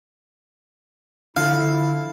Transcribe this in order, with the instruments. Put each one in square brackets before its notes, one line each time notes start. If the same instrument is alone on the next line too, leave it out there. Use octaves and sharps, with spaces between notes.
[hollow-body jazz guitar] D3 [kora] F3 A4 [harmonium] E4 [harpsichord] F5